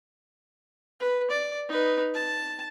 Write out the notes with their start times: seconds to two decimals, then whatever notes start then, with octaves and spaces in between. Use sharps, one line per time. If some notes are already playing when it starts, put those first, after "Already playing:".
1.00 B4
1.30 D5
1.69 D#4 B4
2.14 A5